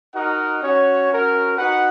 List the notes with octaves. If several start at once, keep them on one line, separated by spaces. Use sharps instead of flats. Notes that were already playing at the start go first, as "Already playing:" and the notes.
D#4 F#4 A#4 D#5 F#5
C#4 F#4 C#5
C#4 F#4 A#4
D#4 F#4 B4 F#5